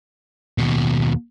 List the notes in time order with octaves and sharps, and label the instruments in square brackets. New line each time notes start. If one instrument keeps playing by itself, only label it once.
[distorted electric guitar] D#2 B2